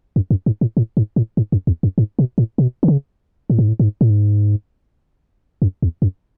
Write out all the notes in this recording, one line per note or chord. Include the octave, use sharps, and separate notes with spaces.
F#2
F#2
G#2
A2
A2
G#2
A2
G#2
F#2
E2
F#2
G#2
B2
A2
B2
D3
C#3
A2
G#2
A2
G#2
A2
G#2
F#2
E2
F#2